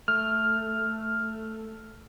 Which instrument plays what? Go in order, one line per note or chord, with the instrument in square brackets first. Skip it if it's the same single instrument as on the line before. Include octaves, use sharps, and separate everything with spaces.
[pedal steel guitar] A3 [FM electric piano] F6